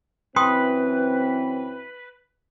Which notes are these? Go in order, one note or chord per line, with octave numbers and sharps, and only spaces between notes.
F#2 E3 C4 B4 G5 C6 D#6